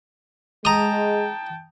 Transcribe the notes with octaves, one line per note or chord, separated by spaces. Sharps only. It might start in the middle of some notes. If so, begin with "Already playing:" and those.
G#3 G5 A5 A#5 D#6